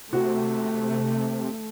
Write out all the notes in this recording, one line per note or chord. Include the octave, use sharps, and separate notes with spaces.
C3 A3 F#4